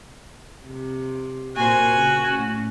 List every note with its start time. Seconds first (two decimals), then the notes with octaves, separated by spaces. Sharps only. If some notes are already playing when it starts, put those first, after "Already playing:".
0.65 C3
1.57 A#2 F#4 A#4 C5 G#5
1.94 C#3
2.30 A2 C#4